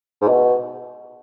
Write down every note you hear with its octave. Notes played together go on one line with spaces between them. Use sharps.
G#2
B2